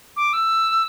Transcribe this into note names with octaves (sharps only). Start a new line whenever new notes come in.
D6
E6